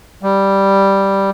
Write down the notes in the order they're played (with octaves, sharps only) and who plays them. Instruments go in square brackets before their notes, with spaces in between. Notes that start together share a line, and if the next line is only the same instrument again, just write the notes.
[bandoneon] G3